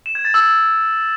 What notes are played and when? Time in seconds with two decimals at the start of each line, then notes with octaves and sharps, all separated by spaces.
0.06 E7
0.15 G#6
0.25 A6
0.34 E6